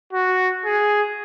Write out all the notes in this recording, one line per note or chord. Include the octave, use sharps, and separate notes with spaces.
F#4
G#4